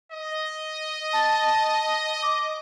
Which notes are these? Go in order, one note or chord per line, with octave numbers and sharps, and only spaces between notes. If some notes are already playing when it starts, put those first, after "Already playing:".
D#5
A5
D6